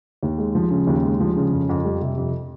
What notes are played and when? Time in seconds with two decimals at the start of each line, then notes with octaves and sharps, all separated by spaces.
0.23 D#2
0.38 G#3
0.55 F3
0.71 C#3
0.87 D#2
1.04 G#3
1.20 F3
1.36 C#3
1.52 F2
1.69 F2
1.85 G3
2.01 C3
2.18 F2